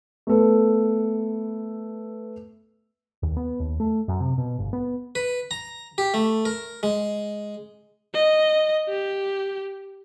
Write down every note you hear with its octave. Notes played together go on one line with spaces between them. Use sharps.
A3 B3 A4 B4
D#2
B3
D#2
A3
F#2
C3
B2
G1
B3
B4
A#5
G4
A3
A#4
G#3
D#5
G4